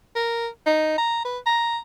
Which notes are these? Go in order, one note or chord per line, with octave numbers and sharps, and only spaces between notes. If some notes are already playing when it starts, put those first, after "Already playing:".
A#4
D#4
A#5
B4
A#5